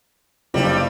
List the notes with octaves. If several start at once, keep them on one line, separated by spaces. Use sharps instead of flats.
F#1 G2 G3